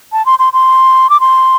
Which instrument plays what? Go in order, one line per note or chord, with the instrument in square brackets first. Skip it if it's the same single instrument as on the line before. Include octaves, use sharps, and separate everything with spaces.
[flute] A5
C6
C6
C6
D6
C6